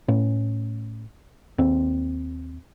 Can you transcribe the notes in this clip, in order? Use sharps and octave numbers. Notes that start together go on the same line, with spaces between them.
A2 C#4
D#2 C4